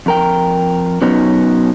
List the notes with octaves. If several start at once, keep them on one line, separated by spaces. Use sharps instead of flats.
F2 A#4 G5
B2 F#3 B3 C#4 D#4